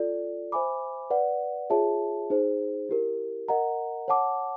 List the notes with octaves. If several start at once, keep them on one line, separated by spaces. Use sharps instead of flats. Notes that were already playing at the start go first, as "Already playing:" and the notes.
Already playing: F4 A4 D5
C5 E5 G#5 B5 D6
B4 D5 F#5
F4 G#4 C#5 E5 A5
D#4 G#4 C5
E4 G4 A#4
A#4 D#5 F#5 A#5
C#5 F#5 A5 D6